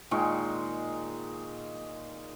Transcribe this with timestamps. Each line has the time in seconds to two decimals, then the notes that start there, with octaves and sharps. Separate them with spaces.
0.11 A#2 D#3 G#3 C#6